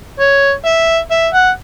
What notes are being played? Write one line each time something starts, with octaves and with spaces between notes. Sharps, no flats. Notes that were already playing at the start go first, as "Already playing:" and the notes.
C#5
E5
E5
F#5